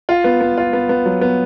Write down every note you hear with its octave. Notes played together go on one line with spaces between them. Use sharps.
F4
B3
B3
F4
B3
B3
F#3
B3